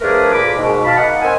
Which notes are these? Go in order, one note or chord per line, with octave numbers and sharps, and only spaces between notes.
F3 A3 D4 G#4 A#4 B4
A#2 B5 D6
G#2 B2
F5 A5 B5
A#3 D#4 D#5 F#5
C4 A#4 D#5 G#5